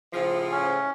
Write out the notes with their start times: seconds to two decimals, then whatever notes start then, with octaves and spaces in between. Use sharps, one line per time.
0.12 A2 C#3 F3
0.51 C#4